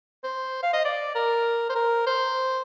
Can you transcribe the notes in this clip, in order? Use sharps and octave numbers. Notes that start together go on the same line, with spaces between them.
C5
F5
D#5
D5
A#4
C5
A#4
C5